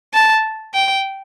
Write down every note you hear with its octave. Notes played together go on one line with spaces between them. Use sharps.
A5
G5